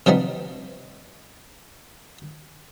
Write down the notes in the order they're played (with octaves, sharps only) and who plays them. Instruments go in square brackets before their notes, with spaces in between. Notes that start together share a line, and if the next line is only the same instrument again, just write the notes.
[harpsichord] C3 F3 G3 B3 D#4